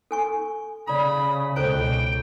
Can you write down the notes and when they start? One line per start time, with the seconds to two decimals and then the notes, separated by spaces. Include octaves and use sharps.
0.11 A4 G#5 C#6
0.87 C#3 D5 A#5 B5 D#6
1.56 C#2 B2 A4 C5 G5 A#5 D7